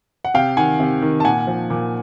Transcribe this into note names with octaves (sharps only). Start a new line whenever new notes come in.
F#5
C3 F5 G5
D#3 F#5 G#5
C3
D#3
A5
A#2 F#5 G#5
F3
A#2